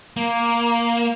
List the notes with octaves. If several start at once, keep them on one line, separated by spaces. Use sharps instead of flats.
A#3